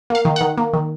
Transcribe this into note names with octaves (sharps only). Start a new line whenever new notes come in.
A#3 F5
D#3
D#3 F#5
A#3
D#3